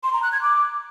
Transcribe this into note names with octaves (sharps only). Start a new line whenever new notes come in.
C6
A#5
F#6
G#6
D6